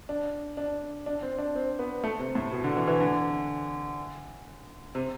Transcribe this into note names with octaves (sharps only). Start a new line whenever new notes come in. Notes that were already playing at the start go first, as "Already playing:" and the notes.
D4
D4
D4
C4
D4
C4
B3
A3
C3
A2
B2
D3
E3
E3
D3
C3